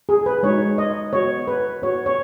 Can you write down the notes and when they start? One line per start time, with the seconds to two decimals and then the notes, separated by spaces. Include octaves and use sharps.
0.09 G#4
0.26 B4
0.43 G#3 D#4 F#4 C#5
0.78 D#5
1.13 B3 F#4 C#5
1.47 B4
1.82 B3 F#4 C#5
2.06 C#5